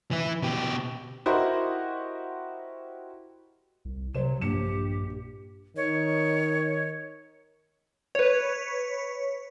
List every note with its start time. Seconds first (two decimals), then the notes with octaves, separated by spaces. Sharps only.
0.11 E3 E4
0.42 B2 G4
1.26 E4 F#4 G4 A#4 C5 D#5
3.85 C2
4.15 C3 F#3 C5 E7
4.41 A#1 G2 G4 C#7 E7
5.77 D#3 C#5
8.15 B4 C#5